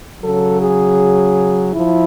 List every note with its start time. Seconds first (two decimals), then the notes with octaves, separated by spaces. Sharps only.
0.20 C#3 F#3 A4
0.59 G#4
1.74 F3 E4